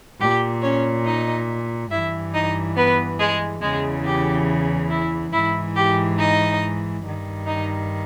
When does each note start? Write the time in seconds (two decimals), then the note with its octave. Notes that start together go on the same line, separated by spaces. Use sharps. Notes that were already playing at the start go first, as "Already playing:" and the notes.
0.20 A#2 G4
0.62 C#4 C#5
1.05 D#4 D#5
1.90 G2 E3 E4 E5
2.33 D#4 D#5
2.76 B3 B4
3.18 G#3 G#4
3.61 E2 C#3 E3 G#3 G#4
4.04 G4
4.89 E4
5.32 G#2 E3 E4
5.75 G4
6.17 D#4 D#5
7.03 G2 D#3
7.46 D#4 D#5